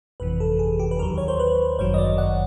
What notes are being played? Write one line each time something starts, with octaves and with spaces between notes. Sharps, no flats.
G1 F2 C3 E3 B4
A4
G#4
G4
B4
D#2 D#3 F#3 A#4
C#5
C5
B4
G1 F#2 D#3 F#3 C#5
D#5
D5
F#5